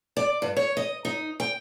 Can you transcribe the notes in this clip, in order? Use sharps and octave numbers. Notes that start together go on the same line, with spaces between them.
D5
G2
C#5
D#5
D#4
G5